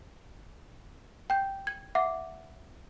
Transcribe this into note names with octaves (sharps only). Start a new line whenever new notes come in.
G5 G6
G#6
E5 F#5 D6